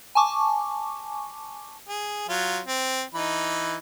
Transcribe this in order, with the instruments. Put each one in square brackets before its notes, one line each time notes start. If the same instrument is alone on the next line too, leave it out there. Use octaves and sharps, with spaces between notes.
[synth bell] G#5 A5 C#6 D6
[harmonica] G#4
F#3 F4
C4
E3 D#4 B5